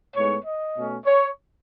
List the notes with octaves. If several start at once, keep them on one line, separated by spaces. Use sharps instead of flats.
A2 G#3 B3 D#4 C#5
D#5
B2 A3 C#4
C#5